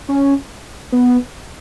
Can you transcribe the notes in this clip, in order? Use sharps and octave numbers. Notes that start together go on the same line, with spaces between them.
C#4
B3